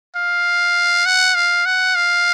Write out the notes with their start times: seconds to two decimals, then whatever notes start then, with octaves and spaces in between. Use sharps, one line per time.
0.16 F5
1.06 F#5
1.35 F5
1.66 F#5
1.96 F5